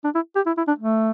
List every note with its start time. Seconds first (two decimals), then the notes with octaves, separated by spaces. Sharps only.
0.04 D4
0.15 E4
0.35 G4
0.46 E4
0.57 E4
0.67 D4
0.79 A3